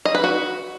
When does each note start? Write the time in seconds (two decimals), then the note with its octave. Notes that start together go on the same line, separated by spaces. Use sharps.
0.05 D#5
0.15 B4
0.24 F#4